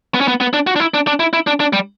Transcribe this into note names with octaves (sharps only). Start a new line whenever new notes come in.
B3
C#4
B3
B3
D4
F#4
D4
E4
D4
D4
E4
E4
D4
D4
G3